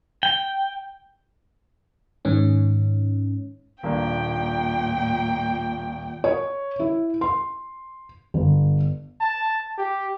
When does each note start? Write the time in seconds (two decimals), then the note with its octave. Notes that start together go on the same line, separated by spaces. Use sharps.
0.23 G5
2.25 G#2 D#3 C#4
3.83 D#1 A#2 A#3 D4 G5
6.24 C#5
6.79 E4
7.21 C6
8.34 G1
9.21 A5
9.78 G4